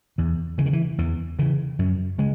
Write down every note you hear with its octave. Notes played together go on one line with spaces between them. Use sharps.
E2 E3
C#3 E3
D#3
E3
E2 E3
C#3 E3
F#2 F#3
C#3 G#3